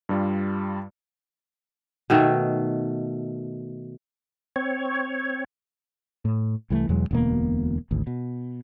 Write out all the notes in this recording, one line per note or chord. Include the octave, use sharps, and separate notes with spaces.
G2 G3 F4
B2 D#3 A3
C4 C#5
A2
C2 E3 G3 A3
E2 B2 F#3 G#3
E1 D2 B2 A#3
G#1 D2
B2